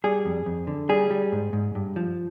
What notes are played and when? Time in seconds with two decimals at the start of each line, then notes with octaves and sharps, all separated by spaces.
0.04 G3 G#4
0.25 F2
0.46 F2
0.67 D3
0.89 G3 G#4
1.11 G3
1.32 G#2
1.53 G#2
1.75 G2
1.96 F3